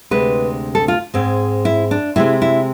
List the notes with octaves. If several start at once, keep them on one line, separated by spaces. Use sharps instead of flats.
D2 C3 G#3 D4 B4
A4
F4
G#2 G#3 C4
E4
D4
C3 G#3 C4 E4
E4